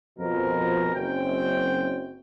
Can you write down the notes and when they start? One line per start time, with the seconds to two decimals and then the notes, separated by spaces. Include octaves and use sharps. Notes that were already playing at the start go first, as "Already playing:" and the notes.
0.19 F2 B2 F3 A#4
0.94 F#1 F#2 C4 G5